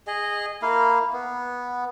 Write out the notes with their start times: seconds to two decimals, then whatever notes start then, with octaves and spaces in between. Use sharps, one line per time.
0.07 G#4 D#5
0.62 A#3 E4 F5
1.13 B3